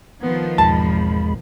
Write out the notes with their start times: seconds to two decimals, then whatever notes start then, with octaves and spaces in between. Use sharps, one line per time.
0.22 D#3 F3 B3
0.58 G#1 E2 B2 G#3 A5 B5